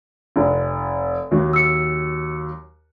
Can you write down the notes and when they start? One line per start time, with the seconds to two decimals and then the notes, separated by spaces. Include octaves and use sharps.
0.36 F1
1.31 D#2 F#3
1.53 E6 C#7